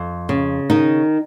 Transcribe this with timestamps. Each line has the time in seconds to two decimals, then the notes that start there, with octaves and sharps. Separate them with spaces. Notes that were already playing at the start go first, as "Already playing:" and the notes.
Already playing: F2
0.29 C#3
0.70 D#3 D#4